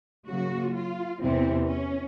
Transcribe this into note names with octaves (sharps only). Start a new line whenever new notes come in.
C#3 F#3 A#3 F#4
F4
E2 C3 E3 C4
C#4